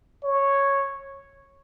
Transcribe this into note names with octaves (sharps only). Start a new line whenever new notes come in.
C#5